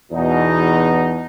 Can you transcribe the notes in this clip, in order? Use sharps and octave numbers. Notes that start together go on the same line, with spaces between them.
E2 B2 D#4